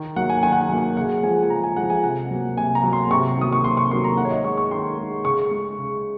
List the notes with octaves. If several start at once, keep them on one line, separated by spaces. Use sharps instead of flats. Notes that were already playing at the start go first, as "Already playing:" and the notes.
Already playing: D#3
F#3 A#3 F#5
G#5
D#3 G#5
F#5
G#5
F#3 A#3
C#3 F#5
F3 G#3 G#5
G#5
C#3 A#5
G#5
F3 G#3 F#5
G#5
C3 F#5
F#3 A#3
C3 G#5
A#5
F#3 A#3
C6
C3 C#6
D#3 F#3 A#3 D#6
C#6
C3 C6
C#6
D#3 F#3 A#3 C6
A#5
D#3 F#5
C#5
D#5
G#3 C#6
C#6
D#3 C6
G#3
C#3 C#6
G#3
C#3